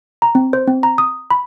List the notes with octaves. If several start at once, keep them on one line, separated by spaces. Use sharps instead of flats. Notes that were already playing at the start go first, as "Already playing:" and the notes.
A#5
C4
C5
C4
A#5
D#6
B5